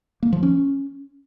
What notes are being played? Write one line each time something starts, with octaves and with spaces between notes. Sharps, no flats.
A#3
F3
C#4